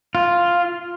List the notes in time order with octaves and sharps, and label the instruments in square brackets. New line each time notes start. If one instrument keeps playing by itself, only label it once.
[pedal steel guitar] F4